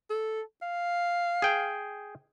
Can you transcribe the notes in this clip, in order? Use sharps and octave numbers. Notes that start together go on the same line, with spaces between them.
A4
F5
G#4 G5